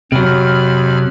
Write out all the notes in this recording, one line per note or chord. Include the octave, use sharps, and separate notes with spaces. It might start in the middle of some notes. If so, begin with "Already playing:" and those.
F2 C3 F#3 B5 F6